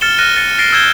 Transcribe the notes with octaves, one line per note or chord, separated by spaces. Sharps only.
F6 A6 C#7 E7 G7
F6 F#6 A#6 D#7
A6 C#7
A6 A#6 C7 D7 G7
E6 G6 G#6 E7 G7